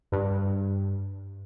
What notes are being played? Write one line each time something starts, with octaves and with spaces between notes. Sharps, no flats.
G2